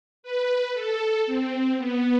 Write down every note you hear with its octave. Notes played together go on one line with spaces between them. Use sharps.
B4
A4
C4
B3